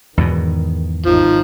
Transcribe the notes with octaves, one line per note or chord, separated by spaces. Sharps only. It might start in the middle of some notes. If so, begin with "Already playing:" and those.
E2 G#2 B2 D#3
G#1 F3 D#4